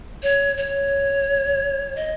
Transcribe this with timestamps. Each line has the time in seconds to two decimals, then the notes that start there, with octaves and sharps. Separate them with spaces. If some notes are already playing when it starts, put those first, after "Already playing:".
0.23 C#5
0.57 C#5
1.96 D#5